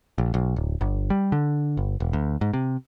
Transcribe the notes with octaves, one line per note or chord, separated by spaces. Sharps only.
A#1
B1
D1
G1
G3
D3
G1
E1
D2
G#2
C3